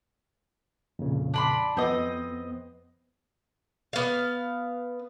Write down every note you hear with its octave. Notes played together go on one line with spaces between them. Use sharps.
F2 A#2 C#3
D4 B5 C6
F2 B3 C4 D#5
B3 F5